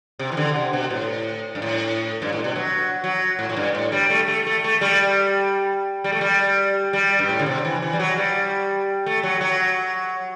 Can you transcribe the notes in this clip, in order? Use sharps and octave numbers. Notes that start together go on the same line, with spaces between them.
C3
E3
D3
C3
B2
A2
G2
A2
G2
A2
B2
F#3
F#3
A2
A2
G2
A2
G3
A3
A3
A3
A3
G3
G3
A3
G3
G3
G2
A2
D3
C3
E3
E3
G3
F#3
G3
A3
F#3
F#3